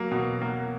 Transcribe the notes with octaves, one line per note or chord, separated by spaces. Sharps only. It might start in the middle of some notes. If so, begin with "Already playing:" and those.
Already playing: F#3 A#3
B2
A#3